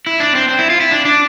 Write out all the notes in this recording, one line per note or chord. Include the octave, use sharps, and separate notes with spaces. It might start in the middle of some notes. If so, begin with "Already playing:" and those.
E4
D4
C4
C4
E4
F4
E4
D4
D4